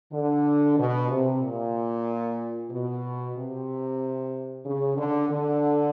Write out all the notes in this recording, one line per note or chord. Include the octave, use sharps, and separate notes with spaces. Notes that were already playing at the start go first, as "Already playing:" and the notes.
D3
B2
C3
A#2
B2
C3
C#3
D3
D3